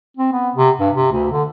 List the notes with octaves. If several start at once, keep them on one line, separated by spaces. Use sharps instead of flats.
C4
B3
C3
G2
C3
D2
D3